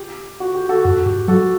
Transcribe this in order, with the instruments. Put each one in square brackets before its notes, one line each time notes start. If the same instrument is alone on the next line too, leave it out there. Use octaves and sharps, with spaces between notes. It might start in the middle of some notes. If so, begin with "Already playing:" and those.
Already playing: [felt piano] G4
F#4
G4
F#4 A4
[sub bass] F#2 [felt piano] F#4
[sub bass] G2 [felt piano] G4
[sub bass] F#3 [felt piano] F#4 A4